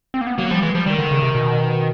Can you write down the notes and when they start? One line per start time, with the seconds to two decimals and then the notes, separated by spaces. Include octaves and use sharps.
0.14 C4
0.21 A#3
0.27 B3
0.38 F#3 A#3
0.50 F3 G3
0.62 E3 G#3
0.75 F3 G3
0.86 D#3 G3
0.98 D3
1.11 C#3
1.22 C3
1.35 B2